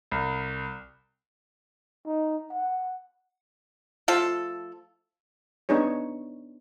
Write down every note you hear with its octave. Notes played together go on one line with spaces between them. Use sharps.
C2
D#4
F#5
F3 A3 F4 A4
B3 D4 D#4 G#4 C#5